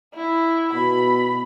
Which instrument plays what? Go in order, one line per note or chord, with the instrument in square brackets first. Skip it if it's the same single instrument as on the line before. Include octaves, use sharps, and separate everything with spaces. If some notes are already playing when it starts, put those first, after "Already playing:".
[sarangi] E4
[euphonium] B2 [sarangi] B5